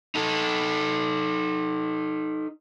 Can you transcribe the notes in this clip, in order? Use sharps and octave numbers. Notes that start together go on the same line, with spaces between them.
D#4 A4